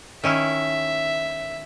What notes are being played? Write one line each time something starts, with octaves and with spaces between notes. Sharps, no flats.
D#3 C#4 E4 E5